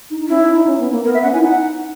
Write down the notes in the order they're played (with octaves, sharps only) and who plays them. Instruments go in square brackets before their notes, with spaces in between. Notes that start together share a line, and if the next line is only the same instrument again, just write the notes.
[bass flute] D#4
D#4
[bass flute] C#4 [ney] E4
[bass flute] D#4
D#4
C#4
B3
A#3
[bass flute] B3 [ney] A#4
[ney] E5
[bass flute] C#4 [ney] F#5
[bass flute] E4 [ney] G#5
[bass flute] D#4 [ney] F#5